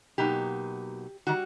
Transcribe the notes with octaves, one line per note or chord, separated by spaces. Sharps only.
B2 F#3 A#3 D#4 G4
D#3 G3 F#4